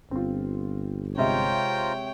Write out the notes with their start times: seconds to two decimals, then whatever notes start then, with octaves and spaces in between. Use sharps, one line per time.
0.11 G1 C4 F4
1.18 C3 G#3 F4 C5 C#5 E5 G5 A#5